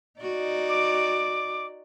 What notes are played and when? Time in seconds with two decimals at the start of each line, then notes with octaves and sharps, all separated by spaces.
0.21 D#4 F#4 D5
0.69 D6